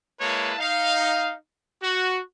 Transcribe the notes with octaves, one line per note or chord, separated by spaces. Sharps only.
G#3 A#3 E4 B4 C#5 A5
D#4 F5
F#4